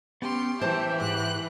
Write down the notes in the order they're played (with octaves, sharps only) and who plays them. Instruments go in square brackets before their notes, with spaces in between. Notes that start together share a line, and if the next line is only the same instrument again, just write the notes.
[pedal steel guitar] B3 C#4 [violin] G4 C6
[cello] E3 G4 [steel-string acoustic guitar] C5 A5 [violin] E5 [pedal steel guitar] G6
[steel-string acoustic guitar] G#2 [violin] F#6